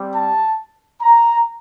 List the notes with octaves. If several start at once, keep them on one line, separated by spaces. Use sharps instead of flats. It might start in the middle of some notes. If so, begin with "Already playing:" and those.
Already playing: G3 C4 G4
A5
A#5